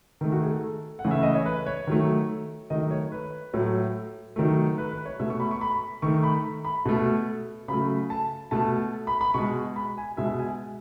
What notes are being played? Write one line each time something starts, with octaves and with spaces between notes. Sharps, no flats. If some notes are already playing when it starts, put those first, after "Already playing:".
D#3 A3
F#4
G#4
A4
F#5
C#3 E3 A3
E5
D#5
C#5
B4
C#5
D#3 F#3 A3
D#3 F#3 A3 D#5
C#5
B4
A2 F#3 A3
D#3 F#3 A3
B4
B4
C#5
B2 A3 E5
C#6
B5
C#6
B5
D#3 A3 C#6
B5
B5
B2 A3
C#3 F#3 A3 B5
A5
B2 A3 A5
B5
B5
B2 G#3 C#6
B5
G#5
B2 G#3 E5
G#5